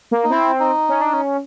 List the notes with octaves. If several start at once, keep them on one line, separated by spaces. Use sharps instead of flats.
A#3
D#4
C4 E4
D#4
C#4
D4
C#4